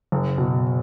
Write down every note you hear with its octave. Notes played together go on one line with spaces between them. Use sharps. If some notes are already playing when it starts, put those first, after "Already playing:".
F#1
B2